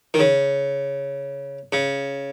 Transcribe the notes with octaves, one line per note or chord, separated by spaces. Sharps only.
D#3
C#3
C#3